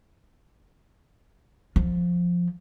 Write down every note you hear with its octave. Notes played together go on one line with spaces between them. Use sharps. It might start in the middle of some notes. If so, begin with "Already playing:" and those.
F3